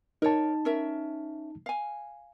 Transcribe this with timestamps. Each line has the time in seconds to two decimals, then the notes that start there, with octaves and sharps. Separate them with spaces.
0.22 D#4 A#4 C#5 A5
0.65 C#4 A#4 E5
1.66 F5 G#5